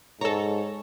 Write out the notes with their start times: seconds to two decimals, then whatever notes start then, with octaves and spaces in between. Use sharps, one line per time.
0.21 G#2 A4 C#5 A#5